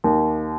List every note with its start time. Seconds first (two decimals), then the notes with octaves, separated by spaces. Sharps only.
0.04 D#2